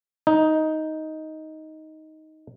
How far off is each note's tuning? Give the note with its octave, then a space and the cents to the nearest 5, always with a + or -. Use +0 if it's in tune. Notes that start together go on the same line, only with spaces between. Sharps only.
D#4 +10